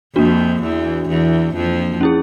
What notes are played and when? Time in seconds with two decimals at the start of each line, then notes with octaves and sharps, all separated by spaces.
0.15 F2 F3 A#3 D4 F#4
0.62 E2 E3
1.09 E2 E3
1.55 F2 F3
2.01 C#4 E4 G#4